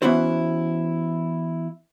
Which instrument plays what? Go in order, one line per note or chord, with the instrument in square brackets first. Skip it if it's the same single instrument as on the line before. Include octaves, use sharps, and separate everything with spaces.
[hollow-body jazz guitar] E3 B3 C#4 E4 F#4 C5